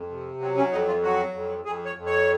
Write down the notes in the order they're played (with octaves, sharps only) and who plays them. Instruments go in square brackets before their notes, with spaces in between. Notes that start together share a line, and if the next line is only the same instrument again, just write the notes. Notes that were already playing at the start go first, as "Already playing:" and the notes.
Already playing: [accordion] F2
C3
F#3 C4
C#4
F2 D#4
F4
F#3 F#4
F2
F2 G#4
C#5
F2
C#5